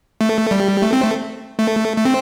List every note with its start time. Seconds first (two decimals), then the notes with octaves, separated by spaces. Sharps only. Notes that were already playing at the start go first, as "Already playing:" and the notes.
0.21 A3
0.51 G3
0.82 A3
0.93 C4
1.02 A3
1.59 A3
1.97 A3
2.05 C4